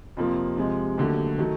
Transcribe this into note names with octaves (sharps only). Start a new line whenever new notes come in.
F2 C3 F3 A#3
C3 F3 G#3
D#2 D3 F#3 A3
D#3 F#3 A3